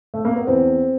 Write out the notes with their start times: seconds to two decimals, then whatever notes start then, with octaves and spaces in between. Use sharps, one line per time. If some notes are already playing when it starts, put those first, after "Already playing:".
0.14 A3
0.25 A#3
0.36 B3
0.47 E2 C4